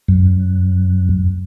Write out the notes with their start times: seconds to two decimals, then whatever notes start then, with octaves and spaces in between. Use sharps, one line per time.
0.08 F#2